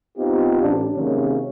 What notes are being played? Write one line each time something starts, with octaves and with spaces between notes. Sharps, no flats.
B3 C4 D#4 F4 G4
A1 D4
C3 D#3 F#3 G#3 A#3 C#4